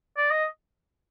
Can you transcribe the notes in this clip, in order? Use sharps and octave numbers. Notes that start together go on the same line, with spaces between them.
D5
D#5